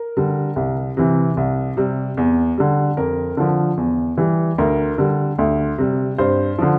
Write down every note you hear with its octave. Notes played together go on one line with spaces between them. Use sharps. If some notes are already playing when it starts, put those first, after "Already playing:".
Already playing: A#4
D3 G3
C2
C3 E3
C2
C3 G3
E2
D3 G3
F2 A#4
D3 F3
E2
E3 G3
D2 A#4
D3 G3
D2
C3 G3
G2 C5
D3 F3